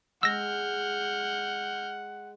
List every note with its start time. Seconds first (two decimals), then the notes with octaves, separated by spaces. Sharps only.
0.23 G#3 F#5 E6 F6 G6 A#6